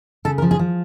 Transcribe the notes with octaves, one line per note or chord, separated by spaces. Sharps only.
C#3 A4
A#4
F3
G#4
F3